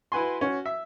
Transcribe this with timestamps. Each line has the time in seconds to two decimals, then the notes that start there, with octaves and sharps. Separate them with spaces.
0.12 E4 F#4 B4 G#5 C6
0.41 C#4 F#4
0.66 E5